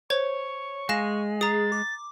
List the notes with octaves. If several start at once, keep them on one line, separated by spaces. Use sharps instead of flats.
C5 C#5 C#6 G#6
G#3 F5 G#5 A#6 E7
G#4 A#5 D#6 A6
D6